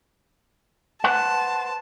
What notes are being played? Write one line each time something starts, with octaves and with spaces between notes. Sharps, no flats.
B4 C5 F#5 A5